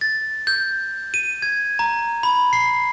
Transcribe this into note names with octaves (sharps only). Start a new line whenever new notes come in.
A6
G6
D#7
G#6
A#5
B5
C7